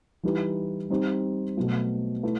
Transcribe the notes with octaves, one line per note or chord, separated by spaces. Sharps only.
E3 G3 D#4 G4 B4
G3 C4 D#4 G4 C5
B2 F#3 A3
A3 E4 B4